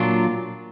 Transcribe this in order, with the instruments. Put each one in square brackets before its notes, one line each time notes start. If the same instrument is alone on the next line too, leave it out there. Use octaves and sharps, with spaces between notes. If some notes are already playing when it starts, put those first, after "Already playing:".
Already playing: [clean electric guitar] A#2 F#3 D4 F4